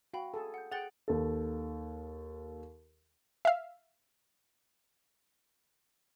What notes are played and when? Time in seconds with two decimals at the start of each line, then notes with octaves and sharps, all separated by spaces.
0.14 F#4 F5 G5 B5
0.34 G#4 A4
0.54 F#5 G6
0.72 G#4 F#5 G5 A6 G7
1.08 D#2 A4
3.45 E5 F5